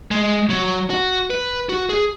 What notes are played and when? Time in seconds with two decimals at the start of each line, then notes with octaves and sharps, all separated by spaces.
0.11 G#3
0.50 F#3
0.90 F#4
1.30 B4
1.69 F#4
1.89 G#4